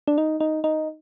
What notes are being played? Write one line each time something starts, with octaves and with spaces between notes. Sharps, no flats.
D4
D#4
D#4
D#4